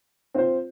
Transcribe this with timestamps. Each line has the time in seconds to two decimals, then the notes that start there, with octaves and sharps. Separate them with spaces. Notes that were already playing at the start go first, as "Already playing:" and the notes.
0.34 C4 F4 C5